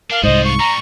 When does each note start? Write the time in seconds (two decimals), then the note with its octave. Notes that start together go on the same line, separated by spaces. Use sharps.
0.11 D4 A#4 F5
0.23 C2 G#2 F4 F#4 C5 D#5
0.44 C#6
0.60 A2 G3 A#5